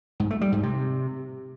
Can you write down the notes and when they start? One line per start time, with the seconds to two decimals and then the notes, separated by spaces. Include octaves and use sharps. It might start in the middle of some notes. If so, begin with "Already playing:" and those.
0.20 G#2
0.30 A3
0.41 G3
0.52 G#2
0.63 C3